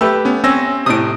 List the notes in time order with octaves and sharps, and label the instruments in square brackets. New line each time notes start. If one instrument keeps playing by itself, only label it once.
[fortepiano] A3 G4 B4 [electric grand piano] E6
[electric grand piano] B3 C#4
[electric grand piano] C4 E6 A#6 [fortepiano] C#4
[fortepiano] A2 D#6 [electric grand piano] C3 D7